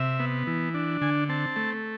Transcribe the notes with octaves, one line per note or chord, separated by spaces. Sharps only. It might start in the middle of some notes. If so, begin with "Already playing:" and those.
Already playing: C3 E5
B3
E3
D4
D3 G#5
C4 A5
A3